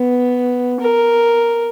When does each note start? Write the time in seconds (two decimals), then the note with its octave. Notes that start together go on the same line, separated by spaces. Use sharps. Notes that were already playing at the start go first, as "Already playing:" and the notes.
Already playing: B3
0.81 A#4